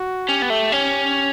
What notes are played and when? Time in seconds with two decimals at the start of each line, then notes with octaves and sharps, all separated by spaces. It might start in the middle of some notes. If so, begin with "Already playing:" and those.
Already playing: F#4
0.29 C#4 G4
0.42 B3
0.50 A3
0.72 C#4